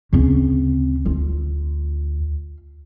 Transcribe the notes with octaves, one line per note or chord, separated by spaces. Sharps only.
D2 C#3 C4
F4